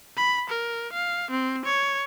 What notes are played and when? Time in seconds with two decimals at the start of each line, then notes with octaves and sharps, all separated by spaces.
0.17 B5
0.50 A#4
0.93 F5
1.31 C4
1.65 C#5